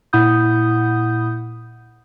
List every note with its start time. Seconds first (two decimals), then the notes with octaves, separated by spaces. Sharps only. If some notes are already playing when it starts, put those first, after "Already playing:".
0.13 A#2 E4 F#5 B5 D#6 G6